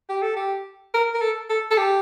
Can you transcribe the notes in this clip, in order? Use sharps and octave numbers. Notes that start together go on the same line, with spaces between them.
G4
A4
G4
A#4
A#4
A4
A4
A4
G4